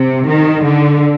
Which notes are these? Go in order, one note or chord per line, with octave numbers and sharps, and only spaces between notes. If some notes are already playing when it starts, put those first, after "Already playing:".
Already playing: C3
D#3
D3